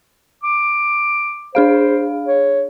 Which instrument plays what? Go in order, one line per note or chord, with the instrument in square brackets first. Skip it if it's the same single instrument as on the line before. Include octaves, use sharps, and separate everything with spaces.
[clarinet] D6
[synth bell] D4 G#4 F5 [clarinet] C5
[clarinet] C#5